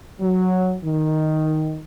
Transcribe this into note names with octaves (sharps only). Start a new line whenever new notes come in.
F#3
D#3